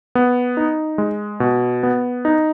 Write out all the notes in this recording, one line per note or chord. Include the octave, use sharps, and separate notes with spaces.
B3
D#4
G#3
B2
B3
D#4